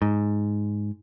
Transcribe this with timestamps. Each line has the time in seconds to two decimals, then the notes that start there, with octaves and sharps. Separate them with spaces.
0.02 G#2